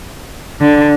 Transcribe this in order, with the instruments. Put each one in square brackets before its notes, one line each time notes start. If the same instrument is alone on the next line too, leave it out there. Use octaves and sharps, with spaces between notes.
[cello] D3